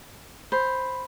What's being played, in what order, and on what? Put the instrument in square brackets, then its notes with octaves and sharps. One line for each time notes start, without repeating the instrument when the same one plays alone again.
[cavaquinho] C5 [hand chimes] B5